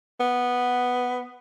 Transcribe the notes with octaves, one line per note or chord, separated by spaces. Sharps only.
B3